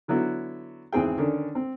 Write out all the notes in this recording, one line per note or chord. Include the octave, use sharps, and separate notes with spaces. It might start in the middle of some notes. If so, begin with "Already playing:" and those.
D3 F#3 B3 E4 F#4
G#1 E2 E3 C4 G#4 G5
D3 D#3 C#4 D4
C4